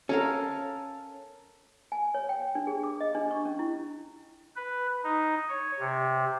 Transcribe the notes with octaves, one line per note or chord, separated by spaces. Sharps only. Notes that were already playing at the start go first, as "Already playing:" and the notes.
C#4 A4 A#4 F5
G#5
C#5
G5
D4
G#4
D6
D#5
D4
C#6
C#4
E4
B4
D#4
C#5
C3